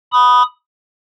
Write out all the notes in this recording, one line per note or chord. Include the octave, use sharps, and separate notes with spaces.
B5 D#6